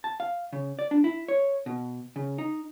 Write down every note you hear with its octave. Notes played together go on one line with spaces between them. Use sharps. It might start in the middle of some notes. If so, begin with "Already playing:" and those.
A5
F5
C#3
D5
D4
E4
C#5
B2
C#3
D#4